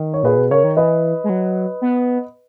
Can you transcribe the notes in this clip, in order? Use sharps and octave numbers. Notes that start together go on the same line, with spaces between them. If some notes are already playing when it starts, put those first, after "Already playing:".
Already playing: D#3
C#5
A#2 G#4 B4
B2
C#3 A#4 C#5
D#3
E3 B4 D#5
G#3
F#3
B3